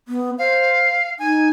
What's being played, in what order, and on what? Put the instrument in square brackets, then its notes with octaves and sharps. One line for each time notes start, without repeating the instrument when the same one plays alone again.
[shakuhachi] B3
[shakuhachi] C5 [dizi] F5
[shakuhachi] D#4 [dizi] G#5